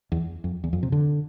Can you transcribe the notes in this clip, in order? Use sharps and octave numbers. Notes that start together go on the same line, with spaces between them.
E2
F2
E2
F2
C3
D3